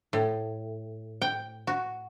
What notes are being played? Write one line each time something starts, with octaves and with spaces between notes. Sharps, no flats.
A2
G5
F#4